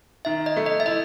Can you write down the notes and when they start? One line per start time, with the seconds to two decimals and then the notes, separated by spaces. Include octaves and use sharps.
0.25 D#3 E5
0.46 D#5
0.56 A3
0.66 D#5
0.80 E5
0.86 E4 D#5